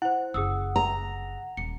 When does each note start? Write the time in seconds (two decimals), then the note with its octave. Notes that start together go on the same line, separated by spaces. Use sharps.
0.02 E4 C5 F#5
0.34 F#1 G#4 D#6 E6
0.76 A#5
1.57 D#1 C#7